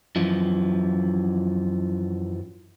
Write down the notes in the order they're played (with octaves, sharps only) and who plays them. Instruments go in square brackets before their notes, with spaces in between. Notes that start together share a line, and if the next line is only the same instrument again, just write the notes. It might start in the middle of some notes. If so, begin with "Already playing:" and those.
[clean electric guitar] F#2 E3 F3